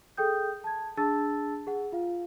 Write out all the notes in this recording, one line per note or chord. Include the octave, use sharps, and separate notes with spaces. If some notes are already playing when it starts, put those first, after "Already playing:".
G#4 A4 G5 D#6 G6
A5 G#6
D4 G#4 A5 E6 A6
G#4 F#5
F4 F5